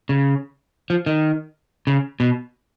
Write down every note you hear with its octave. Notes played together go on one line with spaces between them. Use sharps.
C#3
F3
D#3
C#3
B2